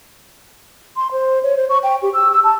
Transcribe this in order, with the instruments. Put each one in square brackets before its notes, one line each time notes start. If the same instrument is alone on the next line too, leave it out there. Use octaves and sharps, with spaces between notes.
[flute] C6
C5
C#5
C5
C#6
G5
G4
E6
E6
A5